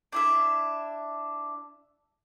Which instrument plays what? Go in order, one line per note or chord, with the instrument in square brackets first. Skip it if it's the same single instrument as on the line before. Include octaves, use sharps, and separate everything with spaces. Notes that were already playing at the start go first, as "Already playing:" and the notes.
[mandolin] D4 E4 E5